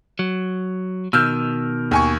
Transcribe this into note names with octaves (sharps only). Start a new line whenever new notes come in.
F#3
B2 D#3 E6 F6 G6
D#2 G#5 C#6